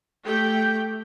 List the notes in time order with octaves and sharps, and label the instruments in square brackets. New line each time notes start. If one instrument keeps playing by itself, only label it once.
[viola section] A3 G4 G5